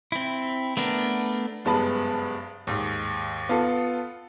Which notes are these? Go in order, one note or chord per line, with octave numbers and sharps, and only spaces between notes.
C4 E4
A3 B3 D4 A#4
F#1 G2 G#3 B3 A5 B5
D#2 G#2
B3 F4 A4